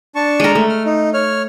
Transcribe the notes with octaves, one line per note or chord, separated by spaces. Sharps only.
D4 A5 C#6
G#3 A#4
A3
F6
D#4
C#5 F6